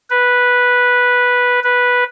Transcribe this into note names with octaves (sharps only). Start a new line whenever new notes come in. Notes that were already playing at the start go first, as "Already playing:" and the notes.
B4
B4